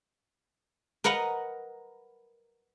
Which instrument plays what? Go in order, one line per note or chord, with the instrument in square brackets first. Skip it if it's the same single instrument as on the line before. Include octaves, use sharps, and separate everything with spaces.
[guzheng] A#4 B4 D#5 F#5 A#5